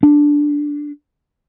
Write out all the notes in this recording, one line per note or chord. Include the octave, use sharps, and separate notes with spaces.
D4